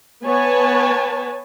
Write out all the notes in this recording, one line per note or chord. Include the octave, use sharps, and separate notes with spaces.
B3 B4 C#5 G#5 A5